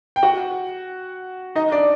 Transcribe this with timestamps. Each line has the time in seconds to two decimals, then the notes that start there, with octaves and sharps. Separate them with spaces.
0.16 G5
0.23 F#4 F#5
1.55 D#4 D#5
1.72 D4 D5